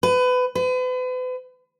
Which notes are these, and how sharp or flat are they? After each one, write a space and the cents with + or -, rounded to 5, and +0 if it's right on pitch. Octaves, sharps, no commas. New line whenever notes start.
B4 +25
B4 +40